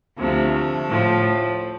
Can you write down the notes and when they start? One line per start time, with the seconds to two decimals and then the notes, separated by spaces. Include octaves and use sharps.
0.17 D2 C3 F3 A3
0.52 A3
0.87 A2 F3